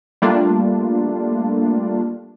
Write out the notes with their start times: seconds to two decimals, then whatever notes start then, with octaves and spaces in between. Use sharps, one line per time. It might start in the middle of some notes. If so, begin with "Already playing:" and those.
0.22 G3 A3 A#3 D4 F4